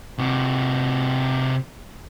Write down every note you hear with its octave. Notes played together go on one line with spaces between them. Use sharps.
C3 F#4